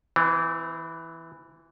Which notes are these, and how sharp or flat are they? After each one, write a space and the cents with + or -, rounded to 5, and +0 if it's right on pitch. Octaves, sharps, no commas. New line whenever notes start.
E3 +0 C4 -40